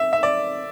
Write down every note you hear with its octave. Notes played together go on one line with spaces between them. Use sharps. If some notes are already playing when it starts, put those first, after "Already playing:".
Already playing: E5
E5
D5